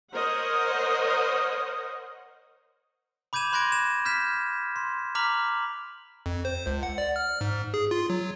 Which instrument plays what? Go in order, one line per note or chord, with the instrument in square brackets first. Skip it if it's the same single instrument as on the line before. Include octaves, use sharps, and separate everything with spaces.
[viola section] A#4 C5 C#5 D#5 F#5
[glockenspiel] B5 D6 G6 G#6 D#7 E7
B5 C6 F#6 G#6 A#6 D7
E7
F6 G6 B6 E7
C6
A#5 D6 F6 B6 F7 F#7
[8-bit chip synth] F2
C5
C#2
F#5
D5
F6
G#2
G#4
F4
F#3